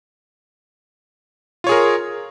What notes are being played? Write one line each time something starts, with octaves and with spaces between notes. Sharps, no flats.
F4 G#4 A#4 C#5